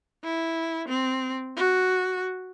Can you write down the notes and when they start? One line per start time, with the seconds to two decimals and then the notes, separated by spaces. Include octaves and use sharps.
0.24 E4
0.89 C4
1.56 F#4